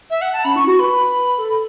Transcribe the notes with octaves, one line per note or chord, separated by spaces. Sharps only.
E5
F#5
A5
C#4 B5
E4 C#6
F#4 C#6
B4 B5
A4